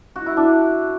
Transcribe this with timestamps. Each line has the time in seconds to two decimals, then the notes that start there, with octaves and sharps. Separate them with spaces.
0.16 F#4
0.26 E4
0.37 D4